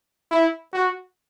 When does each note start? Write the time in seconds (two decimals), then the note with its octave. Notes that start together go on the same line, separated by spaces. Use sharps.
0.31 E4
0.73 F#4